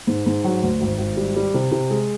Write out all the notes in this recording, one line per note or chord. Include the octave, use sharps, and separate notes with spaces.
G#2
G#2
F#3
D2
G#1
G#1
G3
G3
C3
C3
G#3